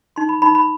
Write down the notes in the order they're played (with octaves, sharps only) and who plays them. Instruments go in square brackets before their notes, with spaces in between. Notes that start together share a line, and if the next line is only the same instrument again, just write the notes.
[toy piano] D#4 C6
B5
D#4 B5
B5